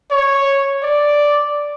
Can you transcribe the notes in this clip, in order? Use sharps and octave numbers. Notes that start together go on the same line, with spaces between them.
C#5
D5